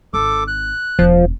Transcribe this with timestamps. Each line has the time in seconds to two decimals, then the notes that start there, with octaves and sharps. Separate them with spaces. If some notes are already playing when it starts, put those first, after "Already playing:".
0.14 G#1 A4 D6
0.48 F#6
0.99 E1 F3